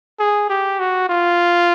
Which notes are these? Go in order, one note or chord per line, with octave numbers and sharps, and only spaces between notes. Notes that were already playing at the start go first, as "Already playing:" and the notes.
G#4
G4
F#4
F4